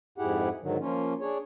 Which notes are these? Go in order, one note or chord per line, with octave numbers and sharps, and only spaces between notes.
F2 G#2 E4 G4 G#4 F#5
G#2 D3 D#3 F#3
F3 A#3 C#4 F4
D4 G#4 C#5